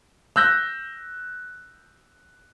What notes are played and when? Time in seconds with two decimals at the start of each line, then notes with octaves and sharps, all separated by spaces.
0.36 E6 F#6 G6 A#6